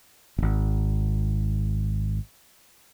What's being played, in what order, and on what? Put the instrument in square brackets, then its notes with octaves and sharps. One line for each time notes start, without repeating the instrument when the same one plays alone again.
[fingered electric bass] D#1 G#1